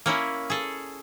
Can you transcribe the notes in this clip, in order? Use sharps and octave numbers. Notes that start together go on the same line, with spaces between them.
A#3 C#4 E4
G#4 A4